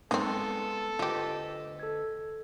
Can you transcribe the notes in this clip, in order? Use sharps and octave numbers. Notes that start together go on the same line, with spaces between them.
G#3 B3 C4 D#4 A4 F5
D2 F4 G4 B4 D#5
A4 G#6